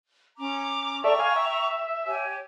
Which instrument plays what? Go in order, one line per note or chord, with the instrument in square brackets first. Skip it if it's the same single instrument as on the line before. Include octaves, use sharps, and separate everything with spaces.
[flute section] C#4 A#5 D6
[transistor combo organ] A4 D5 E5 [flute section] G5 A#5 C#6
[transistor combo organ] F5 G#5
E5
[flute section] G4 C#5 G#5